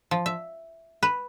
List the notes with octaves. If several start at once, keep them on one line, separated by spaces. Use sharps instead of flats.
F3
E5
B4